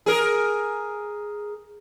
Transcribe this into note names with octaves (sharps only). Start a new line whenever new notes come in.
G#4 A#4